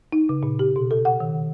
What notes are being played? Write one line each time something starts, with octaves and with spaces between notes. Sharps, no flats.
D#4
C#3
A#2
G4
B2
A4
F#5
D#3